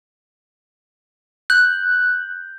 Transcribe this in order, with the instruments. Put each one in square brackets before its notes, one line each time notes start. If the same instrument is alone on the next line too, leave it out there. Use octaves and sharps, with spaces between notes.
[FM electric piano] F#6 [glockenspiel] G6